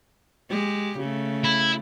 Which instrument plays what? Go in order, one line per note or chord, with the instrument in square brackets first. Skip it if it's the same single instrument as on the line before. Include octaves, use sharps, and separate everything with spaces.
[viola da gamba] G#3 G4
C#3 A3
[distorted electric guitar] E4